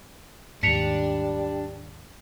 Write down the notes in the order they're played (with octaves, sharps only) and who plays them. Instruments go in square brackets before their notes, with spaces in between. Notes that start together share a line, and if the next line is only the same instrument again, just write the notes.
[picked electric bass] D#2 G#2 [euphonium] G3 [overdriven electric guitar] D4 [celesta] B6 C#7 F7